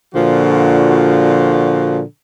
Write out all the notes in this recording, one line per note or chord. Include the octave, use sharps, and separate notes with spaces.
A#2 D3 F3 F#4